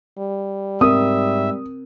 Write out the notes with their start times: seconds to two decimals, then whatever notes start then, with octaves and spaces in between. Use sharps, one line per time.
0.19 G3
0.81 G#2 C4 A#4 E5 D#6